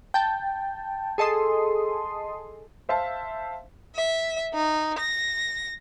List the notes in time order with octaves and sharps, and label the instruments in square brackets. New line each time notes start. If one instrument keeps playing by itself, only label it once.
[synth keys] G5 A5
G#4 A4 D#5 C6 D#6
[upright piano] C5 E5 F5 A5
[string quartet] E5
D#4
A#6